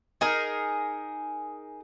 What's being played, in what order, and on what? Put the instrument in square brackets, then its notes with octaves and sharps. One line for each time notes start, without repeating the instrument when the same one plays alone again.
[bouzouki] D#4 G#4 A#4